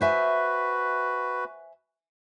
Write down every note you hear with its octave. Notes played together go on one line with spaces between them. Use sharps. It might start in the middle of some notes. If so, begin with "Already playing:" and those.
F#4 B4 C5 E5 G#5